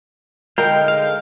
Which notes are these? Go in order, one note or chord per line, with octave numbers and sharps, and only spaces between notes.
D3 G#3 D#4 A#4 F5 G5
F5